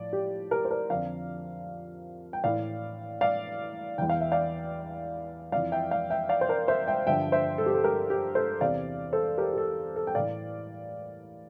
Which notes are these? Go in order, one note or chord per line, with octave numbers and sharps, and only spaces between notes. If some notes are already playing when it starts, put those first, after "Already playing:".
Already playing: A2 F3 D5
G4
G4 A#4
C5
A#4 D5
F2 D3 F3 D5 F5
G5
A2 E3 D5 F5
D5 F5
E2 E3 G5
F5
E5
D5 F5
F2 E3 D5 F5
E5 G5
D5 F5
E5 G5
D5 F5
C5
A#4 D5
C5 E5
E5 G5
G2 D3 F3 E5 G5
C5 E5
A4
G4
A4
G4 A#4
G4
A4 C5
E2 C3 E3 D5 F5
A4 C5
G4 A#4
G4
A4
A4
G5
A2 E3 D5 F5